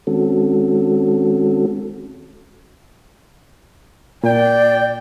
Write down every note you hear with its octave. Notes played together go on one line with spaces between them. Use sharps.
D#3 G#3 C4 C#4 F#4 A4
A#2 D5 G5